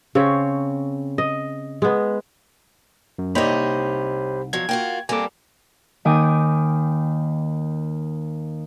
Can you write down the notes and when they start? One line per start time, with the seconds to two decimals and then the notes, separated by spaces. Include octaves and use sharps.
0.15 C#3 C4 C#5
1.18 D#5
1.82 G#3 B3
3.19 F#2
3.35 C2 A#3 D#4 G4 C5 C#5 D#5 B5
4.53 B2 F3 F#3 G#6
4.69 A#3 F4 F#4 G5
5.09 G3 A#3 C4 A4 G#5 D6
6.05 D#2 D#3 G5 G#5 D6 D#6